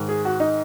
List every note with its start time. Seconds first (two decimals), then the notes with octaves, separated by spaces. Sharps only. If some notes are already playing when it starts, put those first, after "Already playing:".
Already playing: G#2 D#3
0.09 G#4
0.25 F#4
0.40 D#4